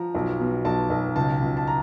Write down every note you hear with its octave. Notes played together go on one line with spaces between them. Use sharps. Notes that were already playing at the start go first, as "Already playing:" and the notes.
Already playing: F3 A#5
B1
B2
B1 A5
B1
C#2 A5
C#2
A5
A#5